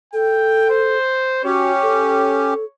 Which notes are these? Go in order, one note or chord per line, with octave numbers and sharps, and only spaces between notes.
A4 G5
C5
C#4 F#4 G4 C#5
A4